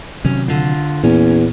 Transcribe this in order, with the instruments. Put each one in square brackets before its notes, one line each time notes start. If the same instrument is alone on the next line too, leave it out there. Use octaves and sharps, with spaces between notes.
[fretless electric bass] C3 D#3 F#3 [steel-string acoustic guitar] C#4
[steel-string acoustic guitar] D3 F4
[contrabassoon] E2 [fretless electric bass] A#2 A#3 [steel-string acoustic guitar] C#4